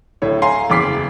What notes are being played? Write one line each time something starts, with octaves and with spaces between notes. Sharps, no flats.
D1 A2 C#5
F5 G#5 A#5 C6 C7
F#1 E2 D6 B6 C7